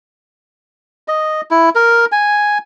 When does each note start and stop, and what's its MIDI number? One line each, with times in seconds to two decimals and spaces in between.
1.08 1.41 75
1.51 1.70 64
1.75 2.05 70
2.12 2.58 80